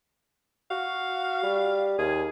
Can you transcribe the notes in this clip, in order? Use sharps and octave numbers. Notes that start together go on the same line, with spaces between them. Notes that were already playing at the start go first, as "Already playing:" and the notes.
F#4 F5
G3
D#2 G#4